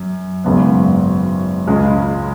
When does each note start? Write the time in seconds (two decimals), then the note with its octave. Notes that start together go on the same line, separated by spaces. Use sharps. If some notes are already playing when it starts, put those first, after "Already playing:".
Already playing: F#2
0.44 G#1 F#2 C#3 B3
1.67 C#2 C#3 G#3